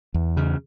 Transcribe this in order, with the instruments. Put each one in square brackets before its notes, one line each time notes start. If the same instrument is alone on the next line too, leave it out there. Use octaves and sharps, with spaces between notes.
[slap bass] E2
C#3